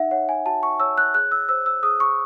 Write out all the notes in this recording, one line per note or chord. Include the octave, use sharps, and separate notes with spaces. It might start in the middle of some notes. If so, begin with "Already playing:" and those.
Already playing: D#4 E5 F#5
C#5 F#5
G#5
F#4 A5
C#6
C#5 E6
F#6
G#4 F#6
E6
C5 E6
E6
G#4 D#6
C#6